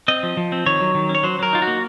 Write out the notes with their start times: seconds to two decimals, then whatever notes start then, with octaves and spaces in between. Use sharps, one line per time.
0.08 C4 D#5
0.23 F3
0.37 F3
0.52 C4
0.66 D#3 C#5
0.80 F#3
0.95 D#3
1.09 C#4
1.15 C#5
1.23 F#3 C5
1.39 F#3 A#4
1.53 D#4 F4
1.62 F#4
1.67 A#3